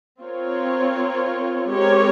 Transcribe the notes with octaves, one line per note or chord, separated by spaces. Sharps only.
C4 F4 A#4 C#5
G#3 C4 G4 A#4 C#5